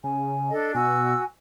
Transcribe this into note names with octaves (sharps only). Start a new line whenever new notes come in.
C#3 G#5
D4 A4 D#5
B2 F#4 G#5 E6